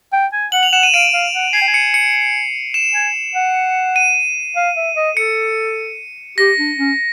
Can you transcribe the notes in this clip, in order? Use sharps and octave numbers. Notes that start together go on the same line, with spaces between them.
G5
G#5
F#5 F#7
F7
F#5 E7
D#7
F5 D7
F5
F#5
G#5 C7
G5
G#5
C#7
C#7
E7
G#5
F#5
D#7
F5
E5
D#5
A4 C#7
G4 A#6
D4
C#4